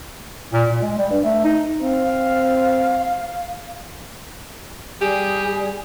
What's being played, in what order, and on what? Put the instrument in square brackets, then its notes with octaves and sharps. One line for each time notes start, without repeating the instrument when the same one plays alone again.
[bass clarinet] A#2
A#2
G#3
G3
G2
A3
D#4
[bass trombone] C4 [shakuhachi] F5
[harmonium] G3 [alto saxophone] G4 [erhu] G#4